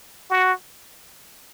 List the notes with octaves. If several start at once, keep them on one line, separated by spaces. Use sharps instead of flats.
F#4